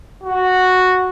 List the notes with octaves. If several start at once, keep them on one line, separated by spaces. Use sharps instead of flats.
F#4